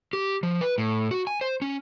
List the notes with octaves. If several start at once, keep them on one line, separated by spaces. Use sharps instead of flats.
G4
F3
B4
A2
F#4
G#5
C5
C#4